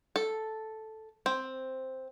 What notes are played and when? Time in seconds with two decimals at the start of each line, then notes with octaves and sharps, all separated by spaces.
0.16 A4
1.26 C4